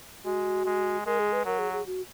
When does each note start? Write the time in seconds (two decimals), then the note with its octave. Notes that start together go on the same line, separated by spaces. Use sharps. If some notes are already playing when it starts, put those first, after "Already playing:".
0.25 G#3 F#4
0.66 G#3
1.06 G#3 A#4
1.19 G#4
1.33 B4
1.45 F#3 A#4
1.59 G#4
1.73 G#4
1.86 F#4